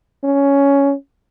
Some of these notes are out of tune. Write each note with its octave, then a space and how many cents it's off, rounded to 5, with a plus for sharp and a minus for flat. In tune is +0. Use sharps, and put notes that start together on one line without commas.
C#4 +10